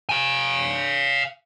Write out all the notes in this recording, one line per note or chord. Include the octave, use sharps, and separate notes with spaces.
F5 G#5